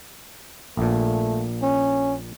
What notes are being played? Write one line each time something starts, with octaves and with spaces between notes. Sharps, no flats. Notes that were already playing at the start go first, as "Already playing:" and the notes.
A#1 A#2 A3
C#4